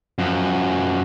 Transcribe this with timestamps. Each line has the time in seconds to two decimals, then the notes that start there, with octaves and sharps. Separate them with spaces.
0.19 F#2 F3